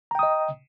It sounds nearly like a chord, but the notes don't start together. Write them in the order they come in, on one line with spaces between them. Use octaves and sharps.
A#5 G5 D#6 D#5